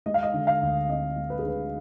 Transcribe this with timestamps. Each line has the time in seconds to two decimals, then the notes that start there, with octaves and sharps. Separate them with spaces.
0.06 G#3 D#5
0.14 F5
0.23 D#5
0.34 D3
0.47 F5
0.61 D2
0.89 C4 D#5
1.16 G#3
1.30 B4
1.39 G#4
1.45 D3 B4